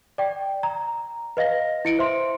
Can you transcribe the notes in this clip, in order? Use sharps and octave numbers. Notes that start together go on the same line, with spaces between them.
D5 G5
A#5
B4 D#5 F5 A#6
E4 C#7 D7
C5 E5 C6